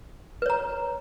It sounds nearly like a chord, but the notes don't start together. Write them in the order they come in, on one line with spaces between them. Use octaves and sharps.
B4 C#5 A#5